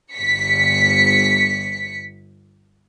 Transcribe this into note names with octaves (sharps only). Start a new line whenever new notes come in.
G1 B6 C#7